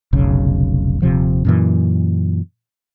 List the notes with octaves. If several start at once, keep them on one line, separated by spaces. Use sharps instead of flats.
F1 B1 C#3
D#1 C3 F3
F#2 A#2 E3